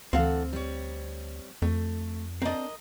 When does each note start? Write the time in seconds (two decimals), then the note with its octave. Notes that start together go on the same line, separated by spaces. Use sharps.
0.13 D2 E3 C4 A4 F5 F#5
0.53 G3 C#5
1.62 F2 A3
2.42 C4 D4 A#4 D#5